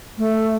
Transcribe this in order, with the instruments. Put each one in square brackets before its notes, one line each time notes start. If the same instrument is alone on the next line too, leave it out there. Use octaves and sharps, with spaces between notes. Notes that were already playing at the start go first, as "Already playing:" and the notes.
[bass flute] A3